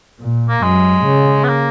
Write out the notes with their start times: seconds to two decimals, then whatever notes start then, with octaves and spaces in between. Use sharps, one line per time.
0.21 A#2
0.49 A#3
0.63 F#2 G#3
1.05 C#3
1.44 B3
1.48 A#3